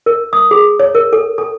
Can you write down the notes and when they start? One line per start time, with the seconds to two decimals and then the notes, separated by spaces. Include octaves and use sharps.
0.06 A#4
0.33 D#6
0.51 G#4
0.80 C#5
0.95 A#4
1.13 A4
1.38 A4